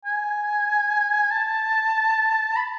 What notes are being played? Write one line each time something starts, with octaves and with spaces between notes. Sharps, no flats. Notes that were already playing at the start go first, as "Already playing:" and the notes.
G#5
A5
B5